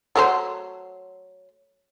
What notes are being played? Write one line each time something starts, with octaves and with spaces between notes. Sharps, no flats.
F#3 A3 C5